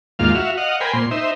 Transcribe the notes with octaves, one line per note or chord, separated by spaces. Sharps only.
D#2 G#2 A#3 F4 F5
F#4 E5 F5
D#5 F5 F#5
A#4 C5 G5 G#5 B5
A#2 C6
D#4 C5 E5